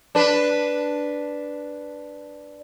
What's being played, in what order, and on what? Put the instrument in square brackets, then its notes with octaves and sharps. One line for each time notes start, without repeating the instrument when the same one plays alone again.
[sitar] D4 B4